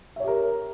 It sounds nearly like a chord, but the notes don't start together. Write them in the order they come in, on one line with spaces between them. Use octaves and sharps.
E5 C#5 G4 A#4